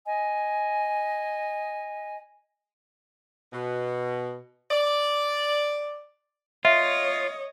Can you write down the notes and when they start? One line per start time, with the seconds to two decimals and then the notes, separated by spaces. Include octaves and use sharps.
0.06 D#5 G#5
3.53 B2
4.71 D5
6.65 F4 C#5 D#5 E5